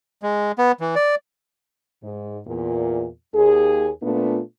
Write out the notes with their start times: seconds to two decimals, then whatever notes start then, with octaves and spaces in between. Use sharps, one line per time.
0.23 G#3
0.58 B3
0.80 E3
0.95 D5
2.03 G#2
2.47 E2 A#2
3.34 D#2 G#4
4.02 A#2 A3 B3 D4 F4